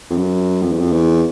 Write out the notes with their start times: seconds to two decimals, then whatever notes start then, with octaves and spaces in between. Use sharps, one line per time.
0.10 F2
0.17 F#2
0.62 F2
0.72 E2
0.80 F2
0.93 E2